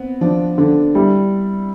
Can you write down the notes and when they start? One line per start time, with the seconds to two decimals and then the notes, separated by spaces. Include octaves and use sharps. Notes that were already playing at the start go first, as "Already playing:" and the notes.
Already playing: B3 C4
0.21 F3 D4
0.58 D3 D4
0.95 G3 E4